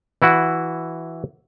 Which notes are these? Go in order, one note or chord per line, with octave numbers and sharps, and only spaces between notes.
E3 E4 F#4